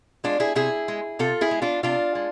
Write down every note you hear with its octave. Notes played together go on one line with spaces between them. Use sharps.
G#3 D4 F4
E4 G#4
C3 E4 G#4
G#3
C3 F4 A4
E4 G#4
G#3
D4 F4
C3 D4 F4
G#3